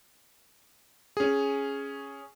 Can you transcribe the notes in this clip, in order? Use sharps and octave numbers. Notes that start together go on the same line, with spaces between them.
C#4 G#4